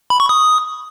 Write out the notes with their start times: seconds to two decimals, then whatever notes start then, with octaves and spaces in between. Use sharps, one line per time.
0.10 B5
0.20 C#6
0.29 D#6